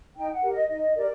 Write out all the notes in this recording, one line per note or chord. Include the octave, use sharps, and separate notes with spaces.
D#4 G5
F#5
G4 A#4
D#5
D#4 D#5
G4 A#4 D5